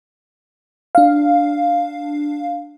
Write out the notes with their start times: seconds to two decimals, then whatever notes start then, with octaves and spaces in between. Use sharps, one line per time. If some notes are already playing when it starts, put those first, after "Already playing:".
0.95 D4 F5